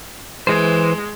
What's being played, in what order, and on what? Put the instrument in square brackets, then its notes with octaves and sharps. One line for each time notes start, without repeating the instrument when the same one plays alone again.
[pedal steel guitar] E3 C5 [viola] G#3